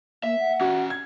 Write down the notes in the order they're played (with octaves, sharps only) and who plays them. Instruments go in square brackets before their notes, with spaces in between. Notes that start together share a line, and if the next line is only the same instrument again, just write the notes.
[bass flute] A#3 [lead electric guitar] E5
[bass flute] F#5
[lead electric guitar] C#4 G4 [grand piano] F#4
[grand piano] G#6